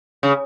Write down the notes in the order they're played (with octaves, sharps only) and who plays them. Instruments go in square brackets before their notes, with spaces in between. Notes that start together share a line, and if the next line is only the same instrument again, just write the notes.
[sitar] C#3